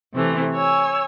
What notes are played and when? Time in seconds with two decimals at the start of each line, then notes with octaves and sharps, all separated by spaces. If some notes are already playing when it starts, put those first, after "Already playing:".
0.14 C3 E3 A3
0.52 C#5 G#5 E6